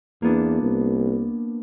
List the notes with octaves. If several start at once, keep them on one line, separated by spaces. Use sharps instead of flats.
E2 A#3 B3 D4
C2